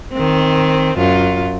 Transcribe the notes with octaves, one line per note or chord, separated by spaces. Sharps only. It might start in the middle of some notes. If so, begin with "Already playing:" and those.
D#3 C4
F#2 F4